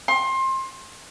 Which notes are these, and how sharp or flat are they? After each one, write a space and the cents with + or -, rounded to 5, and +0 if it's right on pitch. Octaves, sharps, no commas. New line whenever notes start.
C6 +25